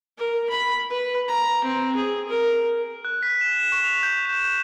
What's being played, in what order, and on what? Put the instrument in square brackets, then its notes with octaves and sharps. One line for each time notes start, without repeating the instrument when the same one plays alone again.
[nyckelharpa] A#4
B5
B4
A#5
C4
G#4
A#4
[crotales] F#6
B6
E7
E7
C#6
F7
G6
E7
G6